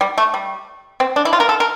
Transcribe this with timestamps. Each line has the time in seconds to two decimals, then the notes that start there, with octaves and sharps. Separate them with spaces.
0.01 G3
0.18 A3
0.34 G3
1.00 C4
1.16 D4
1.25 E4
1.33 F4
1.40 A#4
1.49 A4
1.60 A#4